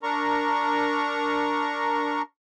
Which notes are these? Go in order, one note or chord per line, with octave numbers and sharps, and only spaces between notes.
D4 A#4 A#5 C#6